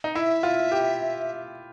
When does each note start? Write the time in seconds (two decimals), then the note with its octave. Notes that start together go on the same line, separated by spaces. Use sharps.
0.04 D#4
0.15 E4 E5
0.43 F4
0.72 G4